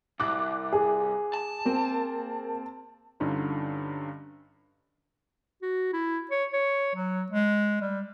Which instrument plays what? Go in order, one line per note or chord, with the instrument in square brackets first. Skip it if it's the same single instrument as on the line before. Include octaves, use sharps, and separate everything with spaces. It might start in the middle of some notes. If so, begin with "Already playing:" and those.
[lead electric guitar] C2 [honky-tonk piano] D6 F#6
[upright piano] G#4
[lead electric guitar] A5
[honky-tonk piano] A#3 C4
[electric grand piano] G2 D3 C#4 D#4 F4
[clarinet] F#4
E4
C#5
C#5
F#3
G#3
G3